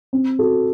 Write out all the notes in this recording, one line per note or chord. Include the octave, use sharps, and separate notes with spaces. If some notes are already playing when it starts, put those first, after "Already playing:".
C4
F#4 A4